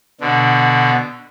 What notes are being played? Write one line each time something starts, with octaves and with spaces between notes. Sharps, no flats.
B2 D3